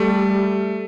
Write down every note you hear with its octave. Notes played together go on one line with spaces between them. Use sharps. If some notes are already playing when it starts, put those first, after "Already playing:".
Already playing: G3 A3